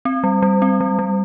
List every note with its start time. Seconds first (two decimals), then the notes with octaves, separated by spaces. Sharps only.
0.05 C4
0.24 G3
0.42 G3
0.62 C4
0.80 G3
0.99 G3